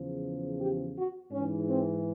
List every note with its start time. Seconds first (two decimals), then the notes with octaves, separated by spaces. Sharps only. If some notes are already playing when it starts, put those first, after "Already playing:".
Already playing: E2 C#3 F3
0.58 G4
0.95 F#4
1.32 G#2 E3 C#4
1.67 C4